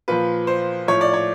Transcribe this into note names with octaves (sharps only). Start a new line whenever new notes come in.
A#2 F3 B4
C5
A2 F3 C#5
D5
C#5